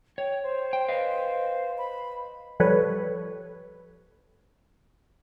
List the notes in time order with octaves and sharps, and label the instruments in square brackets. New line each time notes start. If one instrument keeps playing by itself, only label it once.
[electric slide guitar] C#5 [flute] G5
[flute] C5
[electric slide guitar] G5
B4 D#5 F5
[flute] B5
[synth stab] F3 G3 A4 B4 C#5